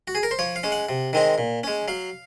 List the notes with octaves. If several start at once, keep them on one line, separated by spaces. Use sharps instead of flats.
F#4
G#4
A#4
C5
F3 C#5
F5
G#3 C#4
F#5
C3
D#3 G#3 C4 D#4
A#2
G#3 C#4
F#3 F5